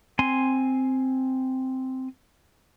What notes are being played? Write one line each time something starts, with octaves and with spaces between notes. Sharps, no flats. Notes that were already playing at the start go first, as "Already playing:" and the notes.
C4 G#5 C6